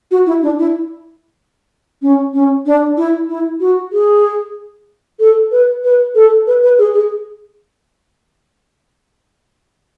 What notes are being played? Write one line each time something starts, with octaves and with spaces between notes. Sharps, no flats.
F#4
E4
D4
E4
C#4
C#4
D4
E4
E4
F#4
G#4
A4
B4
B4
A4
B4
B4
G#4
G#4